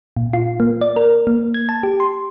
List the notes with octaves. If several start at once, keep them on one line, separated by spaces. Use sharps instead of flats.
A#2
F4
A#3
D5
A#4
A#3
G#6
A5
G4
C6